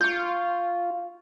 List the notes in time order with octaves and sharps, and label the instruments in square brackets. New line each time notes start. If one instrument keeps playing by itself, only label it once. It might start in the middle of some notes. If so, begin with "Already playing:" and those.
[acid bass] F4 [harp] C#6 G6